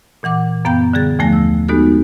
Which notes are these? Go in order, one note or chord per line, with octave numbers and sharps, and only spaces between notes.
A#2 E3 F#5 D6
F#2 B3 F5 G5 A#5 G6
D3 G3 G#4 A6
D#2 D3 F3 A3 G#5 A#6
E6
G#3 B3 D#4 F#4 G4 A4